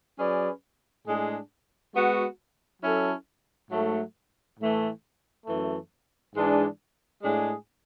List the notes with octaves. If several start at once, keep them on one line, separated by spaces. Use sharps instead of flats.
F#3 C#4 G#4 B4 D5
A2 G#3 D4 G#4
G#3 B3 F#4
F#3 C#4 E4 A4
G#2 F#3 A3
A2 E3 A3
F#2 E3 A3
G#2 E3 G#3 D4 G#4
A2 G#3 D4 G#4